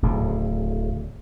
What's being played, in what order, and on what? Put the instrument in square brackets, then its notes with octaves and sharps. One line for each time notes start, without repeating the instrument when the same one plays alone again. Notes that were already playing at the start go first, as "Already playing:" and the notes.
[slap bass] D1 D2 A2 C#3